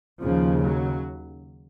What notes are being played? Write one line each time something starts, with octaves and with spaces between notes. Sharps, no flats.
D#2 C#3 F3
F#3